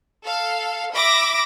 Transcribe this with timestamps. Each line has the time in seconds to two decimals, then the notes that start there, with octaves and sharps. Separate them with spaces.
0.24 A4 F5
0.94 E5 B5 D6 A#6 D7